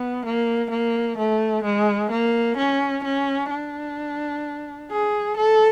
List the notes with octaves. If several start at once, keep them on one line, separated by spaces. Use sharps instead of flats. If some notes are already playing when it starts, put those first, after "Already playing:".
Already playing: B3
A#3
A#3
A3
G#3
A#3
C#4
C#4
D4
G#4
A4